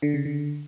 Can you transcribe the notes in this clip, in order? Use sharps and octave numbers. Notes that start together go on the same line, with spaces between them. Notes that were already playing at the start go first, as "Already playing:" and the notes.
D3
C#3
D3